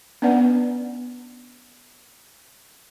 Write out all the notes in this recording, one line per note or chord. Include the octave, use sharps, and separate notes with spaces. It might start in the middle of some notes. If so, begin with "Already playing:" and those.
B3 C#4 D4 B4 D5 F#5